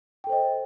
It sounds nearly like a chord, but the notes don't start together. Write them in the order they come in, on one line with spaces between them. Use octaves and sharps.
G5 A4 C5 D#5